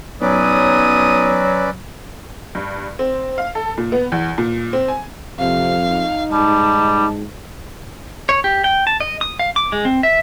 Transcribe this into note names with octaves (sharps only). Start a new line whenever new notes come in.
B1 F#3 C#4 B4 D5 D#6
G2
C4
F5
A4
A#2
B3
E2
A#2
C4
G#5
F2 C3 F5
D#4
G#2 G3 A5
C#5
G4
G5
A5
D#5
D#6
F5
D6
G#3
C4
E5